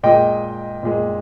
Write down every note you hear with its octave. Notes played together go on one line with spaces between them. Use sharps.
A#2 G#3 D#5 G5
A#2 G#3